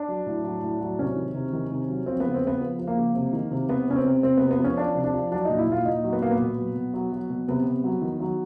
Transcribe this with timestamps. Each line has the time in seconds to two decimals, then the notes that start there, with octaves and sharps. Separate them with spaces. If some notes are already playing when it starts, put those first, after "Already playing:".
Already playing: D4
0.08 F#3
0.26 A2
0.44 F#3
0.62 A2
0.81 F#3
0.99 C3 C#4
1.16 D#3
1.34 C3
1.53 D#3
1.71 C3
1.89 F#3
2.06 F3 C4
2.20 C#3 B3
2.34 C4
2.43 C#3 B3
2.60 F3
2.79 F3
2.87 A#3
2.96 C#3
3.15 C3
3.33 D#3
3.51 C3
3.68 C3 B3
3.87 C3 C#4
3.96 C4
4.05 C3
4.23 C3 C4
4.37 C3 B3
4.51 B3
4.59 F3
4.64 C#4
4.77 F3 D4
4.95 C3
5.04 D4
5.14 F3
5.32 F#3 D4
5.45 A#2 D#4
5.58 E4
5.67 A#2 F4
5.85 A#2 D#4
6.04 F#3
6.13 B3
6.22 A#2 A#3
6.31 B3
6.40 B2
6.57 F#3
6.75 B2
6.94 F#3
7.12 F#3
7.30 B2
7.48 C3 B3
7.66 C3
7.84 F#3
8.02 D#3
8.20 F#3